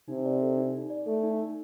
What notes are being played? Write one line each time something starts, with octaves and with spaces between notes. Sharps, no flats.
C3 D#4
D5
A4
D#4
D#4
D5
A3 A4
D#4
D#4